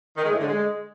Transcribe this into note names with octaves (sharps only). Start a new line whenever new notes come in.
D#3
G#3
A2
D3
G#3